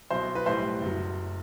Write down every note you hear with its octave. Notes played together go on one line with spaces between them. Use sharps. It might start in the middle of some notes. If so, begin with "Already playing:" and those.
B1 B2 F#3 C5
B4
B1 A2 G3 C5
F#1 F#3